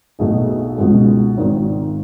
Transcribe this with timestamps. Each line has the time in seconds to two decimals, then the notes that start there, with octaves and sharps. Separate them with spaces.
0.19 B1 B2 A3 D#4 G#4
0.78 C#2 B2 G#3
1.37 G#1 G#2 D#3